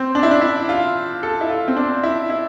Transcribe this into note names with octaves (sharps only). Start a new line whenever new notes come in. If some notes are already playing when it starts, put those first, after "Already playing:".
Already playing: C4
D4
E4
D4
E4
F4
A4
E4
F4
C4
D4
E4
E4